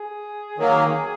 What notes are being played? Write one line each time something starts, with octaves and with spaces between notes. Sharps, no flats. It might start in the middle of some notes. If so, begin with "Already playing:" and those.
Already playing: G#4
D#3 F#3 A#3